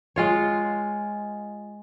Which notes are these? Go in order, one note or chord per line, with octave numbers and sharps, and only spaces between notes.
G#3 F4 C#5